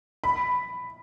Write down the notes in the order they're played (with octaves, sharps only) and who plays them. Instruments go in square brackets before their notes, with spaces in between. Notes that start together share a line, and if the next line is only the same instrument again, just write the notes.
[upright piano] B5